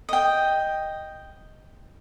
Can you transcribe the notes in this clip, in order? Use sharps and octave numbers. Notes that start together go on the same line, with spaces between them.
D#5 G5